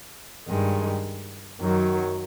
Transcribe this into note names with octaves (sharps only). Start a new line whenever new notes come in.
G2 D#3 G#3
F#2 D#3 F#3